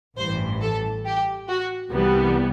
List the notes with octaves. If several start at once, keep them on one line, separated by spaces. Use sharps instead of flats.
A1 G2 E3 C5
A4
G4
F#4
C2 C3 E3 G3 B3